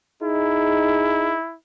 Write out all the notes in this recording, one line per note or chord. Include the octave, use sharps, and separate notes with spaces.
D#4 E4 G#4